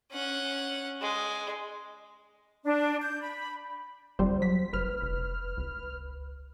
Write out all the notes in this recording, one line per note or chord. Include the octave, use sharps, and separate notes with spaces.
C#4 F#5
G#3
D4
G6
B5
G1 F2 G3 C5
F#3 B6
F#1 B4 F6
F1
C#2